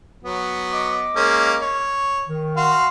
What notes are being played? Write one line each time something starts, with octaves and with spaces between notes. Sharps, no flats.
F#3 B3
D#5 D6
G#3 A#3 C#4
C#5
D#3
F#4 F5 C6